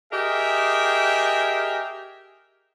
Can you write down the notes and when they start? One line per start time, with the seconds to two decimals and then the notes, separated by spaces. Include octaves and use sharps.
0.12 G4 G#4 A#4 D#5 E5 G5